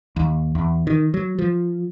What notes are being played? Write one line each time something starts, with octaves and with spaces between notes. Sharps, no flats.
D#2
E2
D#3
F#3
F3